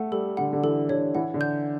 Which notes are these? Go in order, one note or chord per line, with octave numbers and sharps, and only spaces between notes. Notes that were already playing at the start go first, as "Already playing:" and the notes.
Already playing: A3 F#5
G3 A4
D3 F#5
D3
E3 A4
D3 C#5
E3 F#5
D3
G6